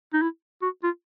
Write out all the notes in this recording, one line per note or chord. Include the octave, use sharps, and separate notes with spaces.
D#4
E4
F#4
F4